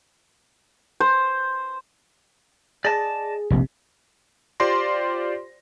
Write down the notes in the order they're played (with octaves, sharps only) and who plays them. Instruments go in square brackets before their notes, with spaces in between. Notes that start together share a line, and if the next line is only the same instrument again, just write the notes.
[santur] C5
[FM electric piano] G#4 [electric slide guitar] D5 D#5 A5
[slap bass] F1 A#1 [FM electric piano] C3
[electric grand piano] F4 G4 C5 D5 C6 A#6